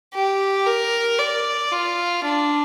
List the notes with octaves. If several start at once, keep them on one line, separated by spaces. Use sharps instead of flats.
G4
A#4
D5
F4
D4